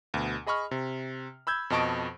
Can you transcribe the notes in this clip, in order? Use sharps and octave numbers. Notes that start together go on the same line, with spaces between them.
D2 B2
G#4 D#5 B5 C#6 F6
C3
B5 E6 G6 G#6
F2 B2 D#5 A5 C#6 D7